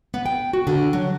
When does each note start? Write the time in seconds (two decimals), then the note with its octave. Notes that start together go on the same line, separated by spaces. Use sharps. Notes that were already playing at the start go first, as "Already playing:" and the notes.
0.14 B3
0.26 G5
0.53 F#4
0.67 D3
0.93 F#3